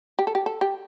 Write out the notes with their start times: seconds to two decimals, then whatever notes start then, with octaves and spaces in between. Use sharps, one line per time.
0.19 G4
0.27 A4
0.35 G4
0.46 A4
0.61 G4